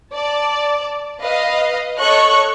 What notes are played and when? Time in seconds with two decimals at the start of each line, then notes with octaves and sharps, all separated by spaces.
0.14 D5 A5
1.21 B4 D#5 F5
2.00 A4 C#5 D#5 C#6 F#6